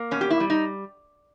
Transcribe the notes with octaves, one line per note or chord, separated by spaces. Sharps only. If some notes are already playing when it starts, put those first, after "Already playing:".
Already playing: A#3
B2 C#4
G4
E4
G3
D#4